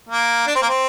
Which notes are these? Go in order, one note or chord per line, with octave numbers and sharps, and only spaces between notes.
A#3
D4
C4
A#3
C4